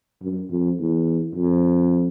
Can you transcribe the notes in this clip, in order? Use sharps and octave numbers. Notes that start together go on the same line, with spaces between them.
F#2
F2
E2
F2